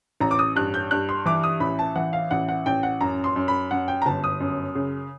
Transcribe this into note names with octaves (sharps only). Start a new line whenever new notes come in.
A1 A#5
D6
D#6
G2 F#6
G6
G2 F#6
C6
E3 D6
D#6
A1 B5
A5
E3 F#5
F5
A1 F#5
F#5
A1 G5
F#5
F#2 A#5
C6
F#2
B5
F#2 F#5
G5
A#5
G1 A5
D#6
F#2
C#3